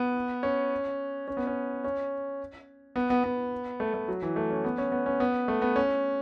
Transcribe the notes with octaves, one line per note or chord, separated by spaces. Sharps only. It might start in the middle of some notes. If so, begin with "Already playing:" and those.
Already playing: B3
C#4
C#4
B3
C#4
C#4
B3
B3
B3
A3
A3
F#3
E3
A3
C#4
B3
C#4
B3
C#4
B3
A3
B3
C#4